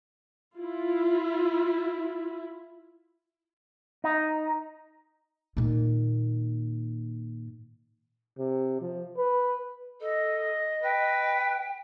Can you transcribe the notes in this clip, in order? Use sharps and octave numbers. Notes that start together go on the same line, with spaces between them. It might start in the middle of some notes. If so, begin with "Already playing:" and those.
E4 F4
D#4
A#2 D#3
C3
F3
B4
A4 D#5
B4 G5